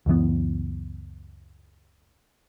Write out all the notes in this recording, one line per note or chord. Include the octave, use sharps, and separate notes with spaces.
C#2 F#2 E3 B3